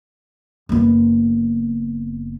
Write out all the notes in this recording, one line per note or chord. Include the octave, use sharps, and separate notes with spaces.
F#1 B3